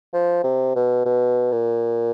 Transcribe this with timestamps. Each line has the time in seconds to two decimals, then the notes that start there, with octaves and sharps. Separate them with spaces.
0.13 F3
0.44 C3
0.75 B2
1.05 B2
1.52 A#2